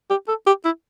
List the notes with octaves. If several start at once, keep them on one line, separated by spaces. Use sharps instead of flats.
G4
A4
G4
E4